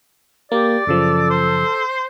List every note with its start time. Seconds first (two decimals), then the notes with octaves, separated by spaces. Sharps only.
0.52 A#3 G4 D5
0.87 F#2 C#3 F3 A4
1.31 C5